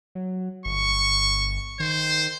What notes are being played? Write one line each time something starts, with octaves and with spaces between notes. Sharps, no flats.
F#3
G1 C#6
D#3 C5